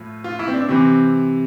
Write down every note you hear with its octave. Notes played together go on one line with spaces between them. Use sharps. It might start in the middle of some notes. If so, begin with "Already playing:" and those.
Already playing: A2 F3
F4
E4
C4
D4
C3 E3 C4